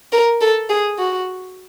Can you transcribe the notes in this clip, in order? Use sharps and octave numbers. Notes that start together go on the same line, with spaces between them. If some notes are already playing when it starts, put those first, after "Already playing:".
A#4
A4
G#4
F#4